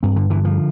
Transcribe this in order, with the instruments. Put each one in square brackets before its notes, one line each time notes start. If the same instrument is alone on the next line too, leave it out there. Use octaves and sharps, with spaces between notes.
[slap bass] G2 C4
D3
D3 E3
F3